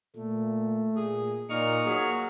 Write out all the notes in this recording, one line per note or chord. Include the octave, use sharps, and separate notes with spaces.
A#2 A3
A#2 G#4
A#2 D#4 C#6 F6
F#3 A#3 G#4